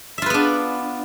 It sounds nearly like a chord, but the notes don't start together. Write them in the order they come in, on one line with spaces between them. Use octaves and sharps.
E5 F4 B4 B3 D4